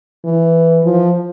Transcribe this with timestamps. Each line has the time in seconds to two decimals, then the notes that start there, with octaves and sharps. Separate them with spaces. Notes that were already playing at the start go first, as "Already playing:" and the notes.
0.25 E3
0.84 F3